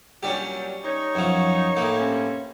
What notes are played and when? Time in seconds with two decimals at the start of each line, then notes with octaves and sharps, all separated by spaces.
0.23 A#2 F#3 G3 C#4 D4 G4
0.84 D#4 C#5
1.15 F#2 F3
1.77 A2 A#3
1.99 G2 C4 C#4